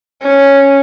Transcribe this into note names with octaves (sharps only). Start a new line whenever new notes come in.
C#4